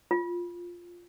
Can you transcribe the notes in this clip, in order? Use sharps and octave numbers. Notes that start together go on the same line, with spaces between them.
F4